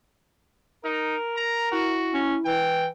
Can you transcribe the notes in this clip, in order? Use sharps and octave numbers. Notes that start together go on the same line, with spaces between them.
D#4 A#4
A#5
E4 F#4
C#4
E3 G5